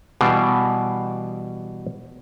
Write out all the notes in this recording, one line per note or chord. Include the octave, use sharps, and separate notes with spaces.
B2 E3 G3 F5 G5 A5